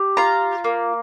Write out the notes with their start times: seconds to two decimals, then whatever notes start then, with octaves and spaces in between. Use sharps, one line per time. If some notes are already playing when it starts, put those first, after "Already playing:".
Already playing: G4
0.17 F4 A#5
0.64 A#3